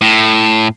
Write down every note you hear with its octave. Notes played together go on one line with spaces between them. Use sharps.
A2